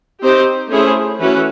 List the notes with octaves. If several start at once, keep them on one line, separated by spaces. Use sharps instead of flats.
C4 D#4 G4 C5
A3 C#4 E4 G#4 C5
E3 A3 C#4 F#4 B4